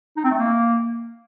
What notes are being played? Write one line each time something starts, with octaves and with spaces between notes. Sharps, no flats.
D#4
C4
A3
A#3